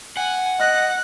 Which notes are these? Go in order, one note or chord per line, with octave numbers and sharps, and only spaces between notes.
F#5 G#5
D#5 F#6